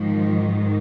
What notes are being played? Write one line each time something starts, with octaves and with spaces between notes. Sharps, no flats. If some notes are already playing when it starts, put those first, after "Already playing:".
Already playing: G#2 D#3 F3